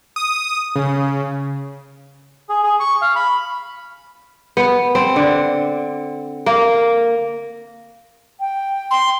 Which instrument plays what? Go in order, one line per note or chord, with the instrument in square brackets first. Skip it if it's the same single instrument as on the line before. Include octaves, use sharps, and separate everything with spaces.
[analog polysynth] D#6
C#3
[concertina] G#4
G#4
C#6
F5
B5
[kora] B3
C4
D3
A#3
[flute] G5
[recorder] C6